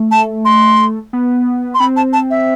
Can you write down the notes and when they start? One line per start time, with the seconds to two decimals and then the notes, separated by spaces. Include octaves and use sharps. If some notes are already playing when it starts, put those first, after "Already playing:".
Already playing: A3
0.11 A5
0.45 C6
1.13 B3
1.74 C6
1.80 C4 B5
1.96 A5
2.13 A5
2.30 E5